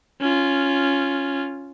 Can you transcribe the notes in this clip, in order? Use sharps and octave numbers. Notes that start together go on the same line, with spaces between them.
C#4 F4